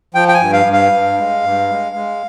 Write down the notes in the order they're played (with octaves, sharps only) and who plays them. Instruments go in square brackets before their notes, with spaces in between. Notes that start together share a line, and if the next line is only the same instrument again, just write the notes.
[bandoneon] F3 G5
G5
G#5
G2
F5
G2
F5
G2
G#3
G2
G#3
G#3